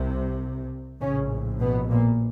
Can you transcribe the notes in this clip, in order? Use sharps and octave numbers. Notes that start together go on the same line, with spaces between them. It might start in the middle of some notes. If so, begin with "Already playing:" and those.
Already playing: C2 C3
A#1 A2 C#3 C#4
B2 B3
A#2 A#3